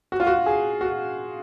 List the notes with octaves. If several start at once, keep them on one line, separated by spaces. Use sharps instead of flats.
F#4
F4
F#4
G#4
F#4